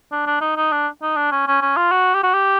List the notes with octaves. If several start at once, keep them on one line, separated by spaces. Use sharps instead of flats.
D4
D4
D#4
D#4
D4
D#4
D4
C#4
C#4
C#4
F4
F#4
G4
F#4
G4